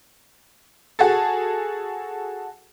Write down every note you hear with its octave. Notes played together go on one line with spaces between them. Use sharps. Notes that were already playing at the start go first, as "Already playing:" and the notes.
F#4 G#4 A4